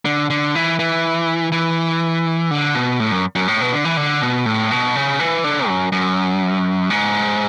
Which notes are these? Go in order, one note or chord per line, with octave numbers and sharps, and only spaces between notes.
D3
D3
E3
E3
E3
D3
B2
A2
F#2
F#2
A2
B2
D3
E3
D3
B2
A2
B2
C#3
E3
D3
F#2
F#2
G#2